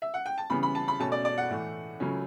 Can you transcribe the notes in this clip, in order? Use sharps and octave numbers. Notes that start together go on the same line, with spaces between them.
E5
F#5
G5
A5
C#3 E3 G3 B3 B5
B5
A5
B5
B2 A3 C#4 A5
D5
D5
F#5
A2 E3 A3
C#2 C#3 F#3 A3 C#4